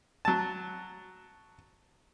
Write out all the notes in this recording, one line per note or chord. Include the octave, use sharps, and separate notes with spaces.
F#3 A5